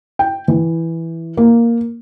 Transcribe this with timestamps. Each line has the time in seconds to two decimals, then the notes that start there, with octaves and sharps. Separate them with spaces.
0.19 G5
0.48 E3
1.37 A#3